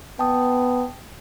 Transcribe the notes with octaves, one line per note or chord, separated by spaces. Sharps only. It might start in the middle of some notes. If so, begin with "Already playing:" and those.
B3 G5 A5 D#6